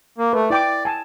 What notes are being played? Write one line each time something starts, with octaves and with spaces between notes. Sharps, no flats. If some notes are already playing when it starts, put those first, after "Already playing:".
A#3
A3 B4
E4 D5 G5 D6
G#5 A5